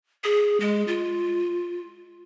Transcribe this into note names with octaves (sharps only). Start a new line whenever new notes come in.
G#4
G#3
F4